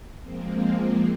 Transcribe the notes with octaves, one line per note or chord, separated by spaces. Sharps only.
F3 G#3 A#3 C4